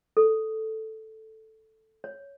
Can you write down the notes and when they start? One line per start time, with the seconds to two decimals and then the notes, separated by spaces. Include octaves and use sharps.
0.17 A4
2.04 C#5